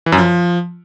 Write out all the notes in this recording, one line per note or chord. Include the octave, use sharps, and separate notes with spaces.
E3
F#2
F3